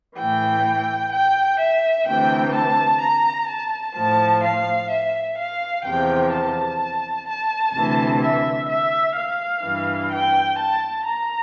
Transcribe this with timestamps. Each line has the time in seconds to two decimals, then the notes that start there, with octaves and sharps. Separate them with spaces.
0.17 A2 E3 G5
1.12 G5
1.60 E5
2.07 D2 C3 E3 G5
2.54 A5
3.01 A#5
3.49 A5
3.96 A2 F3 A5
4.44 F5
4.91 E5
5.38 F5
5.85 E2 C3 F3 G5
6.32 A5
7.28 A5
7.74 D2 C3 E3
8.22 E5
8.69 E5
9.16 F5
9.64 G2 E3
10.12 G5
10.59 A5
11.06 A#5